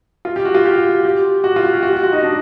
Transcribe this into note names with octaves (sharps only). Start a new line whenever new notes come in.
F4
G4
F#4
F4
G4
G4
F#4
F4
F#4
G4
F#4
F#4
F#4
D#4
D4